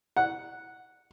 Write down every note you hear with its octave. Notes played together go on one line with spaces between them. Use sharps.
F#5